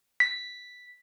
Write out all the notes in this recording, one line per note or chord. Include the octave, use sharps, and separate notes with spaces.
B6